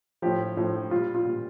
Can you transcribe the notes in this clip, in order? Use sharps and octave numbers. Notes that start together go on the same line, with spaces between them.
A2 F3 G4
A2 F3
A#2 G3 F4
F4
A#2 G3